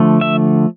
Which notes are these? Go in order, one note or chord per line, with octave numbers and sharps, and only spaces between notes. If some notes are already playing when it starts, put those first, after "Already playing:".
Already playing: D3 F3 A3
E5